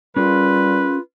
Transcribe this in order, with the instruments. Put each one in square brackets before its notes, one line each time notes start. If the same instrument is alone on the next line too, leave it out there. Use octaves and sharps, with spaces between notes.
[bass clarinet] G3 [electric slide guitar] C#4 G#4 A#4 [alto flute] F4 [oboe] B4